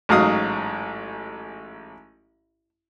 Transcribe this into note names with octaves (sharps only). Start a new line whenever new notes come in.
A1 G#2 F#3 F5 D#6